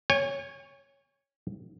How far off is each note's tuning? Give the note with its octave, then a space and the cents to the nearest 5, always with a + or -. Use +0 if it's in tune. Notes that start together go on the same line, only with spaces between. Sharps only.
C#5 +0 G#5 -40